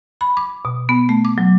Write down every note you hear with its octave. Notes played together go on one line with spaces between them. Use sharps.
B5
D6
B2
B3
A3
D6
F#3